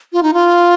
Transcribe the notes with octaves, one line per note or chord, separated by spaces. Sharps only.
F4
D#4
F4